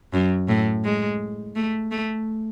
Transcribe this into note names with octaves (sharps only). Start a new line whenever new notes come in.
F#2
A2
G#3
A3
A3